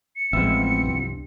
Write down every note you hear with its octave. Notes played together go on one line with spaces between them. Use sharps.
C#7
A1 F3 G#3 B3 C4 E5
C2 G2